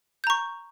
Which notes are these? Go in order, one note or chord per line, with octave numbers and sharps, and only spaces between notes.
A#5 C#6 G6